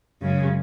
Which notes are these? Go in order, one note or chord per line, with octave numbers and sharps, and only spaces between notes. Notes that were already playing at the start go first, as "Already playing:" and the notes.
F#2 C#3 G#3